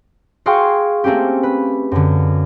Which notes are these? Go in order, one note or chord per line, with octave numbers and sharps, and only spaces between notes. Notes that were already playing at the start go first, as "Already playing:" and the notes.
F#4 G#4 F5 G5 C6 C#6
A3 A#3 C4 C#4 G4
B4
F#2 D3